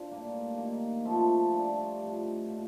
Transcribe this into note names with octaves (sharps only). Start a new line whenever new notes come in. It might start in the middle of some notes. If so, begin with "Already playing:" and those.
Already playing: D3 C4 F4
A2 G3 A#3
D#3 A#3 D#4
F3 A3 C4 F4
G3 D4 A4
A2 F3 C4 D#4
A#2 F3 A#3 D#4